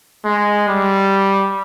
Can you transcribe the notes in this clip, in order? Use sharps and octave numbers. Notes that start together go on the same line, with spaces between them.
G#3
G3